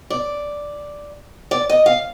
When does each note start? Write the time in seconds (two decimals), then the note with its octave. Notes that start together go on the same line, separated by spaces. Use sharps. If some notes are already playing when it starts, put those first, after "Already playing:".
0.10 D5
1.51 D5
1.69 D#5
1.86 F5